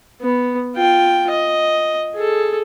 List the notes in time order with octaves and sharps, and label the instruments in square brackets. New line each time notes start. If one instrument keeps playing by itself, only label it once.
[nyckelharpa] B3
F4 G5
D#5
G#4 A4